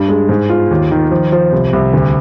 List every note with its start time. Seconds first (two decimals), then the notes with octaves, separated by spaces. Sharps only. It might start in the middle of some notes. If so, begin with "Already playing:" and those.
Already playing: G2
0.09 G#3
0.29 G#2
0.50 F4
0.71 D#2
0.91 D#3
1.11 F3
1.32 F3
1.52 C2
1.73 C2
1.94 D2